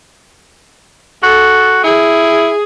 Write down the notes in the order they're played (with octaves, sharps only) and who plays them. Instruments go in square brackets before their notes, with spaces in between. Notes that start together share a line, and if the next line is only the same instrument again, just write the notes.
[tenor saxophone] F#4 [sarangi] A4
[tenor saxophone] E4 [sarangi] G#4